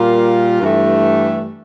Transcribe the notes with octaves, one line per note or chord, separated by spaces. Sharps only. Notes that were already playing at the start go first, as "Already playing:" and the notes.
Already playing: A#2 G3 A#3 F4
G2 E3 A3